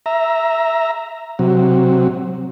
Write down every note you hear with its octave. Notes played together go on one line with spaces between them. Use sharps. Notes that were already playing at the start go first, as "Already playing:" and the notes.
E5 A#5
C3 F#3